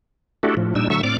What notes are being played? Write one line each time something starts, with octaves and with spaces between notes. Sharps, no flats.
A3 D4 E4 F#4 G4 A4
A2 F3
A#2 G3 D4 D#4 E6
D3 F#3 A3 E5 C#6 E6
A2 C4 D5 D6 F6